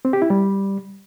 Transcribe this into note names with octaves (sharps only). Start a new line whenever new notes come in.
C4
G4
E4
G3